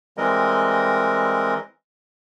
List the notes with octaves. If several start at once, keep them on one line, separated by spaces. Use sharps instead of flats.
E3 G3 G#3 C4 A#4 D#5